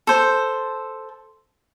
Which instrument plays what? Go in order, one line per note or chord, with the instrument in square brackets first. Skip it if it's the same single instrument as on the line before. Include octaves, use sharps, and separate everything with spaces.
[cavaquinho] A4 C5